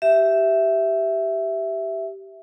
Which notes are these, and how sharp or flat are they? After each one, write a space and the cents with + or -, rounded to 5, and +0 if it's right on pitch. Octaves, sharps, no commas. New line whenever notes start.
G4 -10 E5 +0